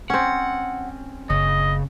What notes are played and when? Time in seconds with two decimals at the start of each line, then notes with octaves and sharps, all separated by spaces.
0.10 C4 C#4 F#5
1.30 F#1 C#3 D#5